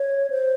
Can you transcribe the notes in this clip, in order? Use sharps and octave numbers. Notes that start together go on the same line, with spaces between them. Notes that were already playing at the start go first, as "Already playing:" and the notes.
Already playing: C#5
C5